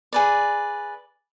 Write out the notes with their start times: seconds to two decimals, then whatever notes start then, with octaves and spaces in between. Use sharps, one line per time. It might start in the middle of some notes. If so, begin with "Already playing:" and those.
0.13 G#4 B4 D5